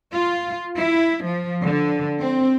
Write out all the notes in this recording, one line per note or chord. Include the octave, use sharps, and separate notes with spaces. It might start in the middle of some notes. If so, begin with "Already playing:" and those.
F4
E4
F3
D3
C4